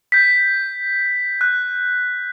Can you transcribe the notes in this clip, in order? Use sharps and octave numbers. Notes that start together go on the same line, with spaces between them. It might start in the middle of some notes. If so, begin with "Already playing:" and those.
G6 B6
F#6